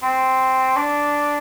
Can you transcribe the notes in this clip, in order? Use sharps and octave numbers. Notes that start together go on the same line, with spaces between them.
C4
D4